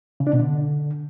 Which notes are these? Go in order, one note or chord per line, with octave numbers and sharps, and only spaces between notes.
C#3
D4
B2
D3